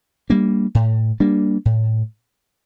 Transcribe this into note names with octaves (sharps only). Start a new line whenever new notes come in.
G3 A#3 D4
A2
G3 A#3 D4
A2